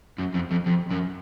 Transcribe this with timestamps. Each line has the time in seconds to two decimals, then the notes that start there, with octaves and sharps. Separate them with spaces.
0.18 F#2
0.34 F2
0.51 F2
0.66 F2
0.91 F#2